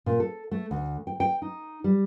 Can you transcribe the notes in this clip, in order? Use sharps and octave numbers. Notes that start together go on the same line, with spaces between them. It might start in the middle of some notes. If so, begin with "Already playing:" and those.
A#2
A4
A3
D2
G5
G5
D#4
G3